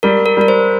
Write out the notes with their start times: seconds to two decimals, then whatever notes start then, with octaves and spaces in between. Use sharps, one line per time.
0.03 G3 A#4
0.26 A#4
0.37 G3 A#4
0.48 C5